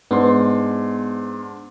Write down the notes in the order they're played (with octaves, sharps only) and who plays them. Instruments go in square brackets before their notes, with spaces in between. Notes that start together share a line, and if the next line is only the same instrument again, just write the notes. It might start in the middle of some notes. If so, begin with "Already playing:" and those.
[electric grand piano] G#2 D4 C6 [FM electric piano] B3